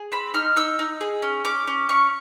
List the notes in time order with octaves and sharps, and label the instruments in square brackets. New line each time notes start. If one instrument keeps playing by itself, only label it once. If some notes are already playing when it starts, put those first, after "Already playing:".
Already playing: [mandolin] G#4
C4 B5
D#4 F6
D#4 E6
D#4
G#4
C#4
C#4 D6
C#4
C#4 C#6